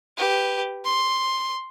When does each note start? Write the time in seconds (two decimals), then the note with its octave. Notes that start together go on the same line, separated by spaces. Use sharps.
0.18 G4 B4
0.85 C6